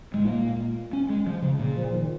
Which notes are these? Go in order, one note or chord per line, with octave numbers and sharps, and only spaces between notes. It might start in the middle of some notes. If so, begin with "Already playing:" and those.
G#2 G#3
A#2 A#3
C#4
G#3
F3
C#3
A#2 C#3
F3
D#3